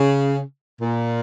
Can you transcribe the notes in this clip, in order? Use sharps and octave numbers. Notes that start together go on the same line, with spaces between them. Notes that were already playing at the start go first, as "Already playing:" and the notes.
Already playing: C#3
A#2